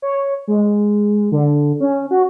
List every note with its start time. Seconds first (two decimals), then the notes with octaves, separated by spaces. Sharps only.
0.02 C#5
0.48 G#3
1.32 D3
1.80 C#4
2.11 F#4